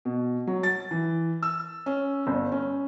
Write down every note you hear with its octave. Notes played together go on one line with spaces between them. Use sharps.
B2
F#3
A6
E3
E6
C#4
G1
C#4